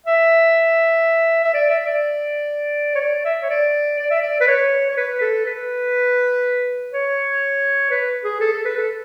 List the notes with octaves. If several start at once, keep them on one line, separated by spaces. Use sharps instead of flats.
E5
E5
D5
E5
D5
C#5
D5
E5
C#5
D5
D5
E5
D5
B4
C#5
C#5
B4
A4
B4
C#5
B4
G#4
A4
A4
B4
A4